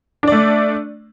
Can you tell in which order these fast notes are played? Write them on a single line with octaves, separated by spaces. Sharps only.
D4 D5 A3